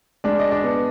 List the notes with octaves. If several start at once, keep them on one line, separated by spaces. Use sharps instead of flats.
G#3 D4 D5
D#5
D4 D5
B3